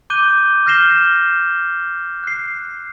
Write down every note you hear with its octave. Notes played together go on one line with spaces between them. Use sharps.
D6 F#6 G6 D#7 G7
F6 G6 A#6 C7 E7 G7
F#6 C7